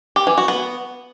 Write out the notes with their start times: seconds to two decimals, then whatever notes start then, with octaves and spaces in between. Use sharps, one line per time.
0.16 G4
0.27 E3
0.38 F#4
0.48 B3